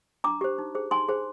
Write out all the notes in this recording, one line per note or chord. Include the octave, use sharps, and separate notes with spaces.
D4 A#5 D6
G4 C5
D#4
G#4 C5
D#4 G#5 C6
G#4 C5